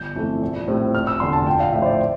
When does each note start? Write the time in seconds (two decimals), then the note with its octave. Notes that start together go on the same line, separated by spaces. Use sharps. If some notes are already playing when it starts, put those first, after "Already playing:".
Already playing: G1 G6
0.16 F2 E3 A3
0.41 A#1
0.67 A2 G3 C4
0.94 F1 F6
1.07 E6
1.20 E2 D3 C6
1.33 A5
1.47 A#1 G5
1.60 F5
1.72 A2 F3 E5
1.82 C5
1.86 D5